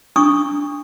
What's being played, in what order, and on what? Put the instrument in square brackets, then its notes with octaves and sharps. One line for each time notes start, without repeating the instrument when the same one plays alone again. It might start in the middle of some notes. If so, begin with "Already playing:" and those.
[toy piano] D4 C#6 D#6